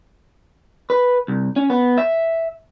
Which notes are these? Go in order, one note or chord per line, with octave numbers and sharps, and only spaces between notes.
B4
C2
C#4
B3
E5